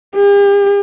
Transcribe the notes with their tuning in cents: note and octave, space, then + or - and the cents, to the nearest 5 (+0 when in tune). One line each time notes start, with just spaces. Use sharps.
G4 +45